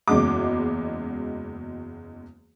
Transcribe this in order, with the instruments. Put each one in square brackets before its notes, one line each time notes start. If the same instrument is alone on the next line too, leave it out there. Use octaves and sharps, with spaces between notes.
[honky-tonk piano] F#1 E2 C#3 G#3 F#4 D6